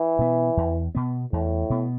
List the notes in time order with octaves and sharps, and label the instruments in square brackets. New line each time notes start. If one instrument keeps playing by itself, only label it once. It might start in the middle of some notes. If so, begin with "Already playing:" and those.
Already playing: [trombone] E3
[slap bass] B2 B3
E2
B2 B3
[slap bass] E2 [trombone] A2
[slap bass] B2 B3